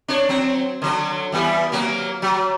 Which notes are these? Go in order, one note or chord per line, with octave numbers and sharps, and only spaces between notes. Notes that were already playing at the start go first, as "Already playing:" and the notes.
D4 C#5
F#3 C4
D3 F#3
E3 G3 B3
F#3 A#3
F#3